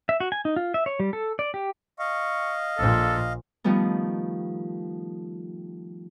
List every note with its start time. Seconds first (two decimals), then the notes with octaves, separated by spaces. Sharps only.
0.09 E5
0.20 F#4
0.32 G#5
0.45 D#4
0.56 F4
0.74 E5
0.86 C#5
1.00 G3
1.13 A4
1.39 D5
1.54 G4
1.99 D#5 F5 C#6
2.78 A#1 A#2 A4
3.64 D#3 F3 G3 A3 B3